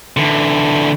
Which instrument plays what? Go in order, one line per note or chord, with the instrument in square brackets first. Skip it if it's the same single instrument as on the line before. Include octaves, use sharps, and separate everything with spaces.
[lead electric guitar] D3 E3